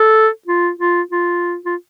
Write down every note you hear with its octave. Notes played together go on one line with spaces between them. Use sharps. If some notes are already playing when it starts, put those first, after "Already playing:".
Already playing: A4
F4
F4
F4
F4